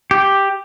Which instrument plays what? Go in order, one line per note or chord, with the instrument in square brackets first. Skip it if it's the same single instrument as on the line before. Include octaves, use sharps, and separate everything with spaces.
[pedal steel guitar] G4